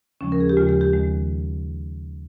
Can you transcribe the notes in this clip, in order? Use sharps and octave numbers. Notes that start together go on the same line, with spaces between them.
D#2 C#3 F3 G#3 C#4
A#4
G#4
G4
D#2 C#3 F3 G#3 F4
G4
G4
D#2 D#3 G#3